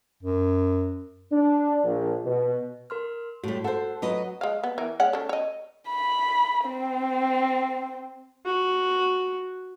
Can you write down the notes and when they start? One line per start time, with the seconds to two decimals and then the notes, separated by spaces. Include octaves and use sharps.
0.23 F#2
1.31 D4
1.84 A#1
2.26 B2
2.90 A#4 C6 F6
3.43 A2 G3 F#4
3.64 A4 C5 F#5
4.02 F#3 B4 D#5
4.41 G#3 F5
4.63 B3
4.78 E3 A#4
5.00 G#3 C#4 F#5
5.13 C#4 A4
5.29 C#5 D#5
5.89 B5
6.66 C4
8.46 F#4